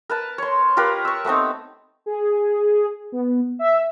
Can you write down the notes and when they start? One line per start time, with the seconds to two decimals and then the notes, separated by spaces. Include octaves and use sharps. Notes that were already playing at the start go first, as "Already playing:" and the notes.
0.09 A#4 B4 A5
0.38 C#5 C6
0.77 F4 G4 A#4 B4
1.05 C#6 E6
1.25 A3 B3 C4 D#4
2.06 G#4
3.12 B3
3.59 E5